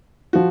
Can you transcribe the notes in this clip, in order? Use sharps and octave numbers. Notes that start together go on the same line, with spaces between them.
F3 F#4